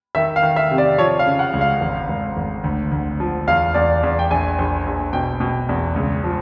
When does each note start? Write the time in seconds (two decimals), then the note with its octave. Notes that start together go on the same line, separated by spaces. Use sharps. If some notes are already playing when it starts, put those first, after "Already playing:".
0.15 D#3 E5
0.36 F5
0.43 D#3
0.56 E5
0.71 C3
0.78 D5
0.98 F3 C#5
1.19 F5
1.26 C#3
1.39 F#5
1.53 C#2
1.61 F5
1.81 G#1
2.09 G#1
2.37 G#1
2.64 D2
2.91 D2
3.20 F3
3.47 E2 F5
3.74 E2 D5
4.03 E2
4.19 G5
4.31 A#1 G#5
4.58 A#1
4.86 A#1
5.13 B2 G5
5.40 B2
5.69 E2
5.96 C#2
6.24 F3